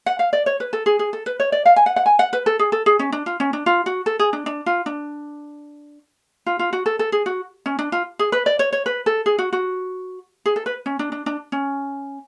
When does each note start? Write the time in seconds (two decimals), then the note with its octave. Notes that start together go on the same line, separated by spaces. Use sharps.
0.06 F#5
0.19 F5
0.33 D5
0.46 C#5
0.60 B4
0.73 A4
0.86 G#4
0.99 G#4
1.13 A4
1.26 B4
1.40 C#5
1.52 D5
1.66 F5
1.76 G#5
1.86 F#5
1.96 F#5
2.06 G#5
2.19 F#5
2.33 B4
2.46 A4
2.59 G#4
2.72 A4
2.86 G#4
2.99 C#4
3.12 D4
3.26 F4
3.40 C#4
3.53 D4
3.66 F4
3.86 F#4
4.06 A4
4.19 G#4
4.33 D4
4.46 D4
4.66 F4
4.86 D4
6.46 F4
6.59 F4
6.73 F#4
6.86 A4
6.99 A4
7.12 G#4
7.26 F#4
7.66 C#4
7.79 D4
7.92 F4
8.19 G#4
8.32 B4
8.46 D5
8.59 C#5
8.73 C#5
8.86 B4
9.06 A4
9.26 G#4
9.39 F#4
9.53 F#4
10.46 G#4
10.56 A4
10.66 B4
10.86 C#4
10.99 D4
11.12 D4
11.26 D4
11.52 C#4